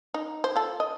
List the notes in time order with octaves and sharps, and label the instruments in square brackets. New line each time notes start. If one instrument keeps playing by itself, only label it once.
[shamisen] D#4
C5
F4 A4
D#5